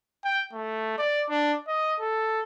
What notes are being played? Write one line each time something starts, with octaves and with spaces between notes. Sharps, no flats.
G5
A3
D5
D4
D#5
A4